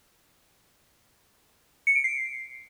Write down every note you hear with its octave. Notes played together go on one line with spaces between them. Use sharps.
C#7
D7
C7